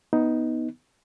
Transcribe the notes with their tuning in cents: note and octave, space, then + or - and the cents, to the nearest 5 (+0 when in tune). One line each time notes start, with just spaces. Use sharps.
B3 +0 D#4 +10